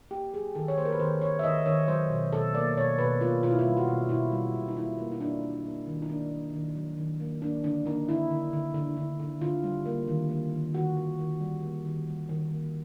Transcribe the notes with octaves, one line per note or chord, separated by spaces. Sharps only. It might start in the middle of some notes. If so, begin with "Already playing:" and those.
A#3 G4
F#3 G#4
D#3 A4
C#5
A#3 C5
A#4
B4
D#3 C5
D#3 C#5
E5
D#3 D#5
D#3 C#5
F#3 C5
B2
B2 A4
A#3 D5
B2 C#5
B2 B4
A#3 F4
B2 F4
E4
F4
G3
F#4
B2
B2 E4
G3
B2
D#4
A#3 E4
A#3
D#4
A#3 D4
A#3
A#3
D#3
D#4
A#3 D4
A#3
D#3
F#3
D#3
A#3
A#3 D4
D3 D4
A#3 D#4
D3 E4
D3
D3
D3
D3
D3
D3 F4
G3
A#3
D#3
A#3
D#3
D#3 F#4
D#3
D#3
G3
A#3
D#3
G3
D#3
A#3